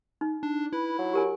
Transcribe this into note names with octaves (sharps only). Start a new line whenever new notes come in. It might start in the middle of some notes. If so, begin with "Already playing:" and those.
D#4
D4
E4 B4
F#3
G4 A#4 G#5